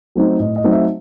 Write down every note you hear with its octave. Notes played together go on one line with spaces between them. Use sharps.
F#3 A3 C4 D#4
A2 D#5
D#5
F#3 A3 C4 D#4
E5